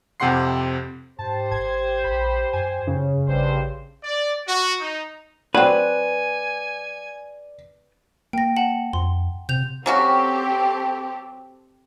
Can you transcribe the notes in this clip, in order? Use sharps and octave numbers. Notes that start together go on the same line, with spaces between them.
F2 C3 G4 F#5 C6 C7
G#2 G4 C5 A5
G#1 G#6
A#1 B5
F#2 G#5
F#2 C#3
A1 G2 G3 C5
D5
F#4
D#4
F#3 C4 B4 D5 G#5
A#3 G5 A#6
F#5 A5 F#7
F2 C6
C3 G6 F7
F#3 C4 C#4 F#4 G4 A4